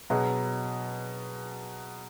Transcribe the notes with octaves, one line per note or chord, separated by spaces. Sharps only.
B2 F#3 B3 G#4